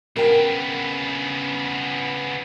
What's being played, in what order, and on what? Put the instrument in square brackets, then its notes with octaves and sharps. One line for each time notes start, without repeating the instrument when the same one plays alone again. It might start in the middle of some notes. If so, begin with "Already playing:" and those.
[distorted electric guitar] C#3 B3 [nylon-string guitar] A#4 G5